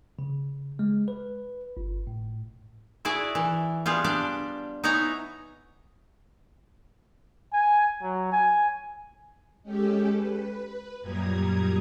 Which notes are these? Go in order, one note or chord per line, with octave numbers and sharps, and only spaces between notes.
C#3
G#3
B4
G1
A2
E4 F#4 G#4 D5
E3
G3 B3 F4 G#4
D4 G4 D5
B3 D#4 E4 C#5 G#5 A#5
G#5
F#3
G#5
G#3 C#4 G4 A4
B4
F#2 A#2 G3 A#5 D#6 G#6